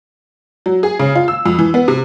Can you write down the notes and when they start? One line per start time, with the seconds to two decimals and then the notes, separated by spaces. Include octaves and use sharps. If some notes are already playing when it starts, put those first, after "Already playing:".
0.66 F#3
0.83 G#4
0.99 C#3
1.15 F4
1.28 E6
1.46 F2
1.59 E3
1.74 B3
1.88 C3